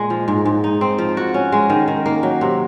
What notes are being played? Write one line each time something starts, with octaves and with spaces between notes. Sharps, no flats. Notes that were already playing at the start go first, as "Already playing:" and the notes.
Already playing: A#2 G#3
F3
G#2
G#2
D#4
C4
F3
F#4
C#4
G#3
D#3
D#3
A#3
F#3
C3